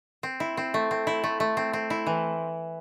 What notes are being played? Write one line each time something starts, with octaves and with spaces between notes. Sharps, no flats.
C4
E4
C4
A3
C4
E4
A3
A3
C4
C4
E4
E3